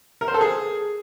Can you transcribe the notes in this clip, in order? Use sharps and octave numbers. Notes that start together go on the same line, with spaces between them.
A#4
C5
A4
G#4